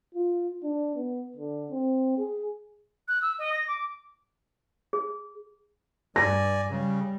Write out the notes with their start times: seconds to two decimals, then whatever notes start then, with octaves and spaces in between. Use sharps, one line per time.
0.15 F4
0.63 D4
0.96 B3
1.37 D3
1.71 C4
2.18 G#4
3.08 F#6
3.22 E6
3.39 D#5
3.53 A#6
3.68 D6
4.93 G#4
6.16 G2 D5 G#5 A#6
6.69 C#3 G3